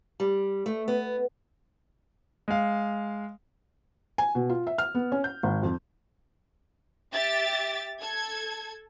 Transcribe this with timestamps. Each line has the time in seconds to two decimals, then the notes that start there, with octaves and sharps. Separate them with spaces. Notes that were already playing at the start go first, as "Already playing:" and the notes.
0.20 G3
0.66 A3
0.88 B3
2.48 G#3 F5
4.18 G#5
4.35 B2
4.49 F4
4.67 E5
4.78 F6
4.95 B3
5.12 C#4
5.24 G6
5.43 G#1
5.63 F2
7.12 G4 E5 A6
8.00 A4 G#6